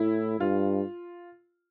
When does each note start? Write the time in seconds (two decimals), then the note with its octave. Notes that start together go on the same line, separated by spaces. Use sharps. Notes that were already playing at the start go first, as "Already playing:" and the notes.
Already playing: A2 E4
0.39 G2 F4